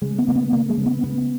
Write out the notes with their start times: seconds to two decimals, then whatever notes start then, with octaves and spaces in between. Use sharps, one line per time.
0.01 C#3 G#3
0.18 B3
0.27 C#3 A#3
0.35 B3
0.52 C#3 A#3
0.69 G#3
0.77 C#3
0.86 B3
1.04 C#3 B3